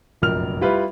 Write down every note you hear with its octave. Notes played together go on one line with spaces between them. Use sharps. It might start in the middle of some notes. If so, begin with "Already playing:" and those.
F1 A#1 F#2 A#4 F6 F7
G3 E4 F4 B4